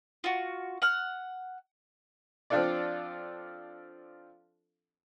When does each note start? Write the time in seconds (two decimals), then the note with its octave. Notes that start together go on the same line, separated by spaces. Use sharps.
0.24 F4 F#4
0.82 F#5 F6
2.50 F3 C4 D4 F4 A4 D5